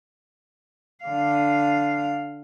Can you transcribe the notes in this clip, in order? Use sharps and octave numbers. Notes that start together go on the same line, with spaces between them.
D3 F5